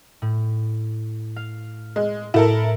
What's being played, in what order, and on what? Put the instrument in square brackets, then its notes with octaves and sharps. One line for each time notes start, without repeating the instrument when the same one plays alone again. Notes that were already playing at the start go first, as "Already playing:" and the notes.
[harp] A2
F5
[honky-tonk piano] G#3
[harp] A2 [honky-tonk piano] E4 A4 A#4